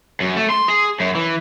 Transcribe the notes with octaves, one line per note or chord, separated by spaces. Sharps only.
F#2
A3
C6
G#4
F#2
E3